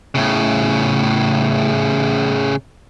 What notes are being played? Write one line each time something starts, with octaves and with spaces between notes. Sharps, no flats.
A2 C#3